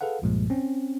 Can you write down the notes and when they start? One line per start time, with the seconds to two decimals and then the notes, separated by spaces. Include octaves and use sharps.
0.01 G#4 A4 B4 F5 F#5
0.22 C2 G2 A#2 F3 G3 G#3
0.50 C4 C#4